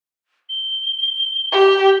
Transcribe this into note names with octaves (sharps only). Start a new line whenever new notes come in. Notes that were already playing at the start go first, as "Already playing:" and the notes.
G7
G4